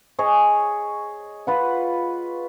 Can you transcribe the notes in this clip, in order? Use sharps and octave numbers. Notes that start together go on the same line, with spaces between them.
G#4 C#5 D#5
F4 B4 F#5